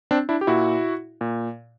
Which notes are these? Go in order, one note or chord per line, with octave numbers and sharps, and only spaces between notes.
C4 D4
D4 E4
G4
A#2 E4 F#4
A#2